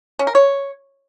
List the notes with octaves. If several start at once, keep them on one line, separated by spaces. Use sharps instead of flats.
C#4
A#4
C#5